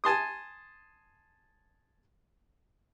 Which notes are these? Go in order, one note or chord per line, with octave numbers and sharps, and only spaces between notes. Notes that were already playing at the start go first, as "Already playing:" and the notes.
G#5 A5 C6 D#6